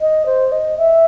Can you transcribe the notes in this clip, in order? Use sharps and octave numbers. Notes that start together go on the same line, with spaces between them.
D#5
C5
D#5
E5